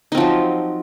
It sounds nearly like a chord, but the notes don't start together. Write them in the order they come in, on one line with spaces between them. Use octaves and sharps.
D#4 C4 F3 F#3